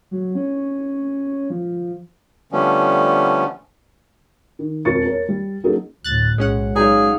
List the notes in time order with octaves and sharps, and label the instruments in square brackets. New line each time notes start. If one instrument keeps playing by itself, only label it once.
[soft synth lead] F#3
C#4
F3
[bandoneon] D3 F3 G3 A3 B3 C#4
[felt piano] D#3
E1 F2 A#4 C#6 A6 C#7
A#4 C#5
G3
F#3 A#3 C#4 D#4 G#4 A4
[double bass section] D2 A2 [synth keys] F#6 A6
[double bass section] B1 [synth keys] G#3 C#4 F#5
[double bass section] F#3 [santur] D#4 F5 [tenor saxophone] G#4